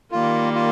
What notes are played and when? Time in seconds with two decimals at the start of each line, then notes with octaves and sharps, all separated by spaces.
0.12 D#3 G3 A#3 F4
0.54 F4